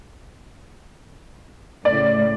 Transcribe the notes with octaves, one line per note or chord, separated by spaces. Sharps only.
A2 C#3 D5